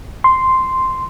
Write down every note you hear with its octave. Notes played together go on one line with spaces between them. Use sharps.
C6